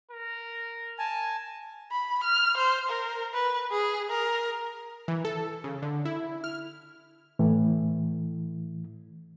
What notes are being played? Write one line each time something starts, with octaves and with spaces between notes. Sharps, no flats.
A#4
G#5 A5
B5
F6
C5
A#4
B4
G#4
A#4
E3
A4
C#3
D3
E4
F6
A2 E3